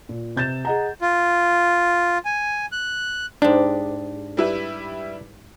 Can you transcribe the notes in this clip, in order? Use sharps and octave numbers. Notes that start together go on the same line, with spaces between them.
A#2
C3 G6 A6 E7
G#4 D#5 F#5 A#5
F4
G#5
F#6
G#2 D4 G4
G3 E4 B4